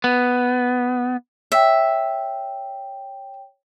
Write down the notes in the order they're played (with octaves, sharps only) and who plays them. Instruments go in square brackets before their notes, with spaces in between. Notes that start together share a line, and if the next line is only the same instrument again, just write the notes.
[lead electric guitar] B3
[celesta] C#5 G5 [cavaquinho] E5